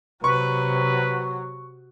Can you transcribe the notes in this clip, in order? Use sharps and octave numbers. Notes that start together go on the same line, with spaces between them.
C3 F#3 B4 C#6